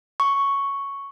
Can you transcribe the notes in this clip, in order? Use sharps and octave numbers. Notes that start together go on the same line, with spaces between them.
C#6